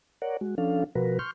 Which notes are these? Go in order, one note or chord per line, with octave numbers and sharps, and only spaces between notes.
A#4 C#5 D5 F#5
G#3 F#4
F3 C#4 D4 A4 F5
B2 F3 F#4 A#4 B4
C6 C#6 F6 G6